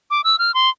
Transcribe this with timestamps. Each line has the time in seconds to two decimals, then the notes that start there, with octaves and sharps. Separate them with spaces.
0.10 D6
0.24 E6
0.39 F6
0.54 C6